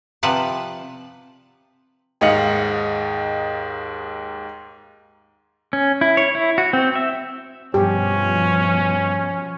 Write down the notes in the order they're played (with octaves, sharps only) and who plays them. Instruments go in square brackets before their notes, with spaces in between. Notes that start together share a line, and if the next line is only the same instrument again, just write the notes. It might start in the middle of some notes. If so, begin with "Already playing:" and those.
[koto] C3 F3 B4 D5 F#5 A5
[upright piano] D#2 G#2 D#5 F5 C#7 F#7
[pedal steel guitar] C#4
E4
C#5
E4
F#4
C4
E5
[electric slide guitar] G2 [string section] B2 F3 [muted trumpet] C#4 [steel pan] G4